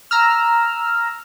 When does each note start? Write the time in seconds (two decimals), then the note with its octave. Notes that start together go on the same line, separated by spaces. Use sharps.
0.11 A#5 E6 F6